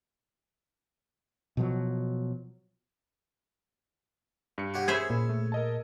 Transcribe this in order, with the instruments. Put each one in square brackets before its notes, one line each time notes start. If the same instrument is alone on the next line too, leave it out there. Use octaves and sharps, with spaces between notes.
[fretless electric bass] B2 F3 F#3
[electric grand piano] G2 C#7
[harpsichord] F#4 G4 C#5
[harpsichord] C#4 [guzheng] G#4 C5 E5 [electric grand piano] B5 E6 G#6
[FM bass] A#2
[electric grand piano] A3
A#4 D#5 A5